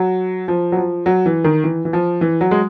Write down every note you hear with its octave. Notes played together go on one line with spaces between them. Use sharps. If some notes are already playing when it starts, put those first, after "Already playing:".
Already playing: F#3
F3
F#3
F3
F#3
E3
D#3
E3
E3
F3
E3
F#3
G#3